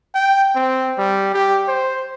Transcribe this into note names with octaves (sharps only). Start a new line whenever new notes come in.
G5
C4
G3
G4
C5